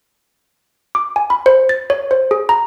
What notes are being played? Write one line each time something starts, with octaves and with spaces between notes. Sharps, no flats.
D6
G#5
B5
C5
A6
C#5
C5
G#4
A#5